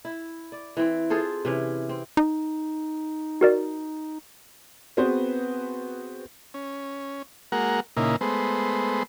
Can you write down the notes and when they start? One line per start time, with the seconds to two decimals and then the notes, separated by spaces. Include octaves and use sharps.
0.05 E4
0.52 D5
0.77 E3 C4
1.10 F4 G#4 A4 C5
1.45 C3 E3 C#4
1.89 C4
2.17 D#4
3.41 F#4 A#4 D5
4.97 B3 C4 F#4 G#4 B4 C5
6.54 C#4
7.52 G#3 A#3 F#4 A#4 F#5
7.97 A#2 C#3 A#3 D#4 E4
8.21 G#3 A3 B3 C5